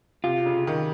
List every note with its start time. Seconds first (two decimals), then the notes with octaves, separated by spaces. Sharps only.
0.24 C3 F4
0.46 C#3
0.67 D#3